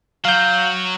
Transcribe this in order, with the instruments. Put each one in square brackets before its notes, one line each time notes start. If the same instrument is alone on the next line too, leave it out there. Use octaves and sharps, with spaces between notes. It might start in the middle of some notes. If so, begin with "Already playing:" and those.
[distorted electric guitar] F#3 [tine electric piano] F5 G6